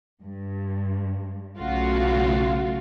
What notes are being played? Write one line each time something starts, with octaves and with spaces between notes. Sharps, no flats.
G2
B1 C#3 A3 F4 F#4